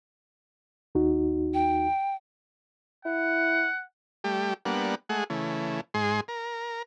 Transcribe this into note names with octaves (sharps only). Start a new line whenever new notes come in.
D#2 D#4 F#4
G5
E4 F#5
G3 A3 G4
G3 A#3 B3 D4 F#5
G#3 A3 G#4 F#5
C#3 E3 A3
G#2 G#3 G#4 C6
A#4